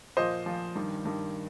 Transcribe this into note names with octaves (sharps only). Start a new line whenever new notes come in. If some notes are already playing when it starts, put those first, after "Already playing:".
A#2 F3 C5 D#5
A#2 F3
G2 D#3
G2 D#3